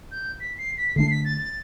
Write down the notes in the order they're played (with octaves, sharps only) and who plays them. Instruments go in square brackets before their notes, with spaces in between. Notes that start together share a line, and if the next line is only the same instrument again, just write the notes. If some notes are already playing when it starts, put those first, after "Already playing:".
[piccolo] G6
B6
C7
B6
[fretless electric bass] D3 A3 D4 [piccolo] C7
[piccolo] B6
A6
A6